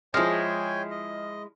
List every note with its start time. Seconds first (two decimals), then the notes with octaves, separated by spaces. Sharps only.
0.14 F3 G#3 E4 G#4 C#5 G5 G#5 F6
0.90 D#5